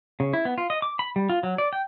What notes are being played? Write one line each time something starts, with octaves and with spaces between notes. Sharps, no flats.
C#3
E4
B3
F4
D#5
D6
B5
G3
F4
F#3
D5
G5